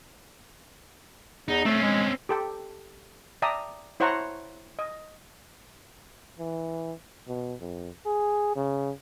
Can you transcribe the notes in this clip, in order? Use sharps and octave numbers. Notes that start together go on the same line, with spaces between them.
E2 D#4
A3 C4 C#4
G#3
G4 A4 G5
D5 E5 G5 A5 A#5 D#6
E4 C5 C#5 F#5 A5 A#5
D#5
E3
B2
F2
G#4
C#3